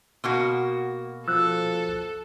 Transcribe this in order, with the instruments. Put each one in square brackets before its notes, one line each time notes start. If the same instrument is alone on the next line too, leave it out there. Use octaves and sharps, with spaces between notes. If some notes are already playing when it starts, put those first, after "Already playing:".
[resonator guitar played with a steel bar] B2 A#3 F#4
[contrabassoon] F3 [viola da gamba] A4 [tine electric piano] E6 F#6